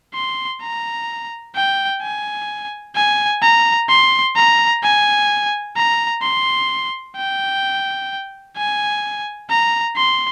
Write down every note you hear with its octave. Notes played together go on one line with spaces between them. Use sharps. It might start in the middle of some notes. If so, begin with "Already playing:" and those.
C6
A#5
G5
G#5
G#5
A#5
C6
A#5
G#5
A#5
C6
G5
G#5
A#5
C6